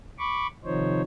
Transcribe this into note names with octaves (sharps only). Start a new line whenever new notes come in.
B5 C#6 D6
C3 D#3 F3 D#4 C5 C#5